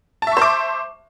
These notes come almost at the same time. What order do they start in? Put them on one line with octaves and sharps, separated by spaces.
A5 E5 C#6 C5 D6